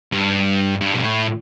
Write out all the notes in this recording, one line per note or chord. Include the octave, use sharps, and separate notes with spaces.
G2
G2
B2
A2